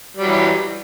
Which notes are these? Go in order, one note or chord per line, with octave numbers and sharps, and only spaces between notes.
E3 F#3 G3